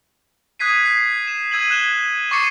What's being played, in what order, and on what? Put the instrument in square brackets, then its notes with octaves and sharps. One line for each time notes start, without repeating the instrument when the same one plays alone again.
[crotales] D#6 F#6 G#6 B6 C7 D#7
C7
E7
E6 G#6 D#7 F#7
F#6 G#6 E7 G7
C#6 D6 A6 C7 C#7 D#7